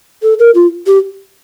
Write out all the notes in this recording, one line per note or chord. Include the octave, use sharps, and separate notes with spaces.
A4
A#4
F4
G4